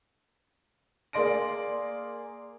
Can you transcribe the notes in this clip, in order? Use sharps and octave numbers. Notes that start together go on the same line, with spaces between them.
A#3 G#4 D5 C6 A#6 D7